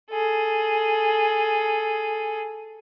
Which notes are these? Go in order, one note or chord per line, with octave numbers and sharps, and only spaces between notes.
G#4 A4